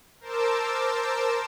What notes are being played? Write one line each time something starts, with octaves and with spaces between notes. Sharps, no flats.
A#4 C5 A5 D6 E6